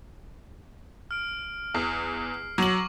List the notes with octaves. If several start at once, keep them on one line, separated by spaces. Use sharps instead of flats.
F6 D7
E2 C7
F#3 C#6 D6 F#7